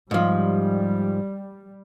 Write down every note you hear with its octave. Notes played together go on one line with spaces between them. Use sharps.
G#2 F3 G3